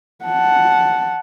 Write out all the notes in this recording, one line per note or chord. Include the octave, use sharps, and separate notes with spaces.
F#5 A5